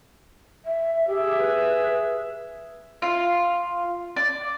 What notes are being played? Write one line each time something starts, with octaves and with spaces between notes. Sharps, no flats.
E5
G4 G#4 E5
B4
F4
D5